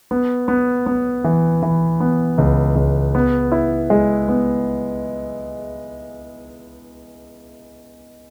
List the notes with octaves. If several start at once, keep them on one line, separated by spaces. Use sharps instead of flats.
B3
B3
B3
E3
E3
B3
C#2
C#2
B3
E4
G#3
B3